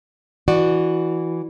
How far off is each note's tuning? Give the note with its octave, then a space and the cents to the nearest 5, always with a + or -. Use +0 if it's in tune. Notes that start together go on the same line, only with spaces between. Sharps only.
E3 +0 F#4 +0 D5 +20